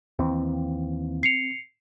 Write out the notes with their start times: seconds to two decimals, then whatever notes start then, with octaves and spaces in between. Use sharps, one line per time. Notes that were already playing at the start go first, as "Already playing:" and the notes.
0.19 D#2 E3 C4
1.23 C7 C#7 F7